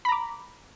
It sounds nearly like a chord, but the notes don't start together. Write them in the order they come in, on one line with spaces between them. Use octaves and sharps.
B5 A#5 D6